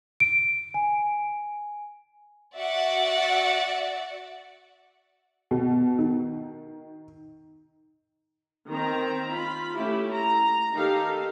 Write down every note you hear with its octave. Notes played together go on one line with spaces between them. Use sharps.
D7
G#5
F#4 D5 E5 F#5
B2
D#3
D#3 C4 A#5
F4 B5
A3 C#4 E4 G4
A#5
D#3 D#4 G4 A4 F5